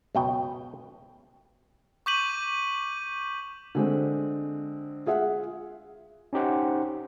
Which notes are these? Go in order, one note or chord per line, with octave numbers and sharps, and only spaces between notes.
C#2 F#2 B2 B4 G5
C#6 D6 G6 B6 D#7 F#7
D3 G#3 C4
F4 G#4 E5 F#5
C#4 D#4 G4 C5 F#5